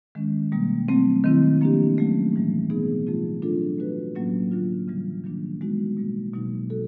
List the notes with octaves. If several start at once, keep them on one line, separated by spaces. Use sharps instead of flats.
D#3 G#3 C#4
B2 G3 A#3
F#3 A3 C4
D#3 G3 C4 E4
F3 A#3 D4 G4
F#3 A3 C#4
A2 E3 G3
B2 F#3 B3 D#4 G#4
F3 A3 C4 F4
F#3 A3 D4 F4 A4
A3 D4 F#4 B4
A2 F#3 A#3 C#4
D3 F#3 A#3 D4 F4
C#3 E3 G3
D#3 F#3 A#3 D4
G#3 B3 D#4 F#4
B2 G3 A#3
B2 F#3 A#3 D#4
F#4 A4